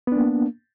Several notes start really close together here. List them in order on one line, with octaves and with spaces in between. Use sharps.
B3 D4 A#3